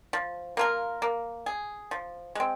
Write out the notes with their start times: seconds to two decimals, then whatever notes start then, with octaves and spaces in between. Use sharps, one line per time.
0.13 F3
0.57 A#3 F4 A#4
1.02 A#3
1.46 G#4
1.91 F3
2.35 G#3 C4